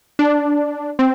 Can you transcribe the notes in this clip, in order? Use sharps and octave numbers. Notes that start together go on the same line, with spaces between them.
D4
C4